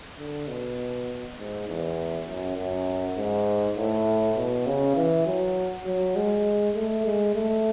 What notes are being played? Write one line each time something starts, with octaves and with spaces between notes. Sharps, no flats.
D3
B2
G#2
E2
F#2
F#2
G#2
A2
B2
C#3
E3
F#3
F#3
G#3
A3
G#3
A3